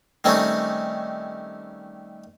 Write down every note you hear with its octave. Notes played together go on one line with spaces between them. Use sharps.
D#3 G3 A3 C4 C#4 D#4